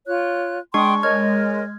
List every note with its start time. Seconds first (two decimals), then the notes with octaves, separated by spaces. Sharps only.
0.07 F4 C#5 F#6
0.74 G#3 D4 G5 C6 C#6 D#6
1.03 A#4 C#5 D#5 F6 G#6